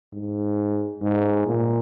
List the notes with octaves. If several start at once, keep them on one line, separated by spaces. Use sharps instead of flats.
G#2
G#2
A#2